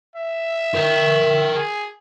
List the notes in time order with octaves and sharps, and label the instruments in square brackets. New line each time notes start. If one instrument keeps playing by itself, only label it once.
[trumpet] E5
[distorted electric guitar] A#4 G5
[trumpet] G#4